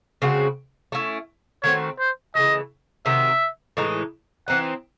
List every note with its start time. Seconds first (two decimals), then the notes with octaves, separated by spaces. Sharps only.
0.22 C#3 G#3 C4 F#4
0.92 A3 C#4 E4
1.63 D#3 A3 C4 F#4 C#5
1.99 C5
2.35 C#3 E3 A3 D#5
3.06 C3 D#3 F#3 E5
3.77 A2 E3 G#3 D#4
4.48 E3 C4 D#4 F#5